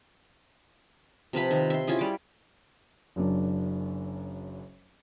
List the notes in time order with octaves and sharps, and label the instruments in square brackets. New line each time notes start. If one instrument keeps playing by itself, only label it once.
[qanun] C3 F3 B4 B5
D#3
E5 C6
C#4 E4 F4 G#4
G3 D6
[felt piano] F#1 F#2 D4